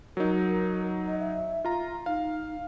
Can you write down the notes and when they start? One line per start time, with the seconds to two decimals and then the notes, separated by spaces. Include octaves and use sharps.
0.17 F#3 D#4 A#4
1.06 D#5
1.19 E5
1.65 F4 A#5
2.06 D#4 F5